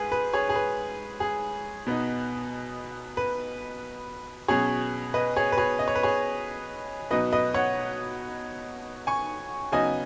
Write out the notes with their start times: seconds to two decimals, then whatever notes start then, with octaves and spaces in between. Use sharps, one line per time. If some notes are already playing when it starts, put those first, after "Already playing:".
Already playing: G#2 G#4 B4
0.12 B4
0.33 G#4 C#5
0.49 G#4
0.55 B4
1.20 G#4
1.87 B2 B3 D#4
3.17 B4
4.48 B2 F#3 C#4 G#4 C#5
5.14 B4 D#5
5.36 G#4 C#5
5.52 B4
5.58 G#4 C#5
5.79 D#5
5.88 C#5
5.95 B4
6.03 G#4 C#5
7.11 B2 F#3 D#4 B4 D#5
7.33 B4 D#5
7.54 C#5 F#5
9.07 G#5 C#6
9.72 C#3 F#3 B3 D#4 D#5 G#5